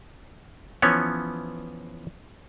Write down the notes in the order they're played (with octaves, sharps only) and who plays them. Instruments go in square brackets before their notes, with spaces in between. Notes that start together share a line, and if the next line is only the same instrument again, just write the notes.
[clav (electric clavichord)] E3 F3 B3 C#4 C#5